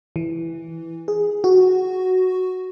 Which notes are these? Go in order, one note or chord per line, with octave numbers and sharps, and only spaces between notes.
E3
G#4
F#4